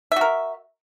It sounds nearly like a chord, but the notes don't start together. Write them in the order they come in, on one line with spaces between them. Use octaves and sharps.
E5 F#4 A#4